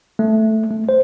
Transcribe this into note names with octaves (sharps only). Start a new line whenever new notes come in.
A3
A3
C5